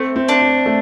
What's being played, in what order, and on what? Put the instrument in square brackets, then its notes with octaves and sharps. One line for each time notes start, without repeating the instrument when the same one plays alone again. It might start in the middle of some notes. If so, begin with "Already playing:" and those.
Already playing: [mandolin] A3 [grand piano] C4
[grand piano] C4
[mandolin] D4
[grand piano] C4
A3